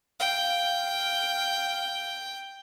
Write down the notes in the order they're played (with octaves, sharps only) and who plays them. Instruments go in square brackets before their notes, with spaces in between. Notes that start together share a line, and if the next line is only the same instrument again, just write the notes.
[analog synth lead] F5 [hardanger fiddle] G5